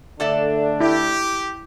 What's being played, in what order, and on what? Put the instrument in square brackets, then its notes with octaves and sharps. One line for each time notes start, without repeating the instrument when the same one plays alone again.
[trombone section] D3 A3 D4 [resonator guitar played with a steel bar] A4 D5 E5
[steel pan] E4 [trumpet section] G4